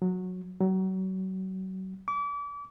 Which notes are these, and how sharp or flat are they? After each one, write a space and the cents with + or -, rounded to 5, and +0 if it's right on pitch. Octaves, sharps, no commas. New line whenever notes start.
F#3 -15
F#3 +30
D6 -35